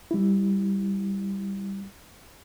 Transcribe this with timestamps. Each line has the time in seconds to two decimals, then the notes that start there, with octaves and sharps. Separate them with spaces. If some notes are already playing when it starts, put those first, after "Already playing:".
0.11 G3 E4